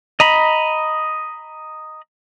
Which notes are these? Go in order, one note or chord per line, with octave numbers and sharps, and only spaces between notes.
D#5 A#5 B5